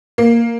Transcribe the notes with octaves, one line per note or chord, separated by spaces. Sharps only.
A#3